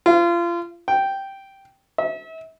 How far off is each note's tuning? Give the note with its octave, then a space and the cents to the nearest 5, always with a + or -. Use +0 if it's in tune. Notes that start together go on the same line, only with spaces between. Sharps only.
F4 -30
G5 -5
E5 -35